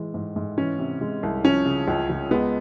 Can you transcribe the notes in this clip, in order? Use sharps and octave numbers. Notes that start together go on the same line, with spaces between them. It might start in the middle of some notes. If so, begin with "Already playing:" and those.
Already playing: A2 E3 G#3
G#2
G#2
E3 C#4
C3
G#3
C2
F3 C#4
C#3
C#2
C#2
G#3 B3